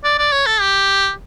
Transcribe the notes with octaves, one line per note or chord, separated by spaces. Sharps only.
D5
D5
C#5
A4
G4